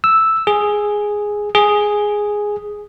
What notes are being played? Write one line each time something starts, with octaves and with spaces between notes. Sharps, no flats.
E6
G#4
G#4